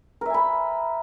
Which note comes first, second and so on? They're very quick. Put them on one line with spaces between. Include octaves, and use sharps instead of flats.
A#4 E5 G#5 B5